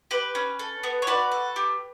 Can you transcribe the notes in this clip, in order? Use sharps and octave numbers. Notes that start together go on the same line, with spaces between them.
G4 B4
C#4
A4
B3
C#5
F#4 B4 D5
A4
G4